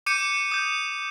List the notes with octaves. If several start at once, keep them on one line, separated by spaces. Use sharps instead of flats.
D6 G6 C#7 D#7
D#6 G6